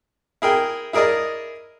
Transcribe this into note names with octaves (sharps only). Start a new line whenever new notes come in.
E4 G#4 A#4 G5
E4 G#4 A#4 D5 D#5